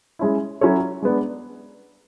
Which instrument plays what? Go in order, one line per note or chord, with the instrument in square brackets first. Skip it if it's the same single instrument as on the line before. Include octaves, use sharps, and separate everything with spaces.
[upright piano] G#3 C#4 E4
F#3 C#4 E4 A4 C#5
G#3 B3 D4